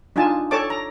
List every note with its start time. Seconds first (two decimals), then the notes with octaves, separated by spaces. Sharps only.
0.16 D4 D#4 F4 G#5 A5
0.51 A4 C#5 D5 A5 D6
0.70 A#5